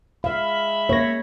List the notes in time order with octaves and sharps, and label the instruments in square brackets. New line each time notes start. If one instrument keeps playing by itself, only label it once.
[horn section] G#3 E5 B5 [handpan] F5
[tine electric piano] A#3 A#6 [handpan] C#5